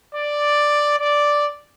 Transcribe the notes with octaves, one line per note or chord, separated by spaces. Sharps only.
D5
D5